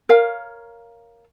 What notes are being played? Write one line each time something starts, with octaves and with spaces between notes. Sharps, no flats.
A#4 C#5 F5